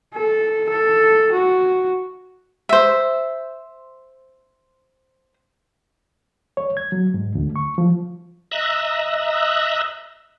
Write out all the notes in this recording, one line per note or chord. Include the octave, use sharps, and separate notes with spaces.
A4
A4
F#4
C5 E5
C#5
G#6
F#3
G#2
D2
C#6
F3
D#5 E5 A#5 E6 F#6